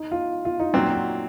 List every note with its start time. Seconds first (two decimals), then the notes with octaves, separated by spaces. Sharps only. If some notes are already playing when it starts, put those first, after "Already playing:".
Already playing: D#4
0.12 F4
0.45 F4
0.59 D#4
0.73 A#2 F#3 C4 D#4
0.94 F#4